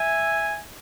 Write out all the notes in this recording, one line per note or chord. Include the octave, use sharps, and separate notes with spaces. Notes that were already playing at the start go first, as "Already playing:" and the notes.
Already playing: E5 G#5